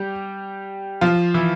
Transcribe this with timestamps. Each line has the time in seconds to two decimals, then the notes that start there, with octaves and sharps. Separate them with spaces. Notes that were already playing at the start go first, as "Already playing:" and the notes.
Already playing: G3 G4
1.01 F3 F4
1.34 E3 E4